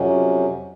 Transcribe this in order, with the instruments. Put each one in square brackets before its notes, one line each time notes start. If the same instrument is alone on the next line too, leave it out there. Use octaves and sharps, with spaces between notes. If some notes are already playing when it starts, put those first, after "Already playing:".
Already playing: [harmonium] F2 C3 F#3 C#4